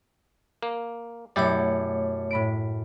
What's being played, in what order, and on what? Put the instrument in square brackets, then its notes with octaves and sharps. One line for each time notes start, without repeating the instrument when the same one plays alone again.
[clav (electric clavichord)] A#3
[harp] F#2 B2 [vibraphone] A3 C#5 [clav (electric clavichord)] E4 G4 D5
[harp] A2 B5 D7